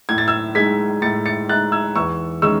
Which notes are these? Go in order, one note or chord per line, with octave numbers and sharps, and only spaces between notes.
A2 G#6
A6
E6 G#6
G#3 D#4 G#6 B6
A2 A6 C#7
A6 C#7
G#3 D#4 F#6 A6
E6 G#6
E2 C#6 E6
D#3 G#3 C#4 C#6 E6